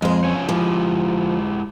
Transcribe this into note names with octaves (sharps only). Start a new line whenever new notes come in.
F2 G#3 C5
F3 C#4 C#5
F3 G#3 E4 G4